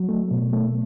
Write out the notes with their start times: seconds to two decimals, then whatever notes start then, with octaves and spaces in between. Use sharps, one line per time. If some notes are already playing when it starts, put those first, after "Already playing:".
Already playing: F#3
0.09 A3
0.31 B2
0.53 A3